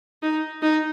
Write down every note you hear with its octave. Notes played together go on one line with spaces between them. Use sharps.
D#4
D#4